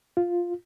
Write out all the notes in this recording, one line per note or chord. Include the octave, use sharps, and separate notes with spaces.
F4